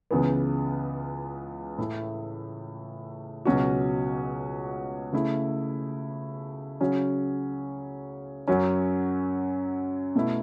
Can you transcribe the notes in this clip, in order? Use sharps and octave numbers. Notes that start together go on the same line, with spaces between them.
C#2 C#3 E3 B3
A2 A3 E4
C#2 B2 F#3 C#4 F#4
C#3 A3 E4
C#3 F#3 C#4
F#2 F#3 C#4
B2 A3 E4